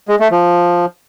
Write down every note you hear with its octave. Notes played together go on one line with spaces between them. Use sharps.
G#3
A3
F3